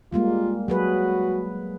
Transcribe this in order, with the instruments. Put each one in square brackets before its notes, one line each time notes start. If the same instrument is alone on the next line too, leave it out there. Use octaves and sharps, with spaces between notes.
[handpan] G3 G#3 A#3 [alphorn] F4
[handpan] F#3 G#4 B4 [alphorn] F#4